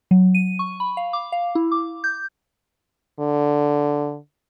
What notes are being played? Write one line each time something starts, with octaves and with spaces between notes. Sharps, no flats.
F#3
D#7
C#6
B5
F5
D6
F5
E4
D6
G6
D3